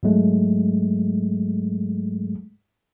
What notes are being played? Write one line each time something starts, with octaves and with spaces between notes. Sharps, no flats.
G#2 F#3 G#3 A3